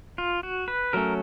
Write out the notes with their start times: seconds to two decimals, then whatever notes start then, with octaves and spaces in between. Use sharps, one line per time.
0.18 F4
0.43 F#4
0.68 B4
0.93 F#3 A3 C#4 A#4